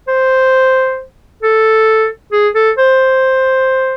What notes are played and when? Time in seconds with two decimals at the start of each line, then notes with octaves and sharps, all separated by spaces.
0.08 C5
1.43 A4
2.32 G#4
2.55 A4
2.78 C5